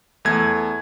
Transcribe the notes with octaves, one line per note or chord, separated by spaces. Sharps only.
E2 A3 G#6